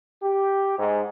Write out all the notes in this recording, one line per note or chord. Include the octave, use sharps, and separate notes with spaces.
G4
G#2